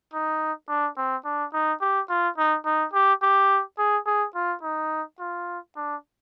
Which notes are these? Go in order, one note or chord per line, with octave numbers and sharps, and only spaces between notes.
D#4
D4
C4
D4
D#4
G4
F4
D#4
D#4
G4
G4
G#4
G#4
F4
D#4
F4
D4